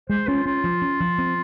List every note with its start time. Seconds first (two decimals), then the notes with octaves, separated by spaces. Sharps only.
0.10 G#3 C5
0.27 C#4 F4
0.46 C#4 F4
0.64 F3
0.82 C#4
1.00 F3
1.18 C4